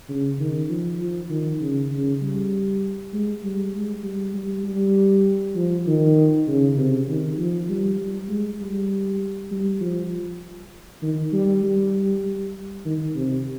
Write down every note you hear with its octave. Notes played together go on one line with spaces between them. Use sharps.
C#3
D#3
F3
F3
D#3
C#3
C#3
G3
G#3
G3
G#3
G3
G3
G3
F3
D#3
C#3
C3
D#3
F3
G3
G3
G#3
G3
G3
F3
D#3
G3
G3
G3
D#3
C3